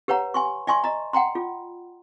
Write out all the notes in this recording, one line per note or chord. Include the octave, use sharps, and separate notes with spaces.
G4 B4 C#5 F#5 A#5
G#5 C6 C#6
D5 E5 G#5 C6 C#6
D#5 A#5
F#5 G5 A#5 C6
F4